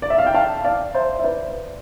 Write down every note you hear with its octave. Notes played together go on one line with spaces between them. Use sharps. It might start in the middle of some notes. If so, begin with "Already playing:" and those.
D5
E5
F5
G5
F5 A5
D5 F5
C5 E5
E5
B4 D5